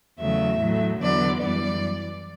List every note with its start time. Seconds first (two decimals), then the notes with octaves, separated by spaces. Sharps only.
0.19 E2 C#3 F#3 A3 E5
0.60 A2 F#3 A3
1.01 E2 D3 F#3 B3 D5
1.42 F#2 E3 G3 D5